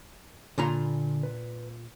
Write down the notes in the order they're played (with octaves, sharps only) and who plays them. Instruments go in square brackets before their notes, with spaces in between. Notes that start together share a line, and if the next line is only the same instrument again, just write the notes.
[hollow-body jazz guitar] A#2 F4 A#5 [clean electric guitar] D3 G#5 B5
[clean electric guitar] B4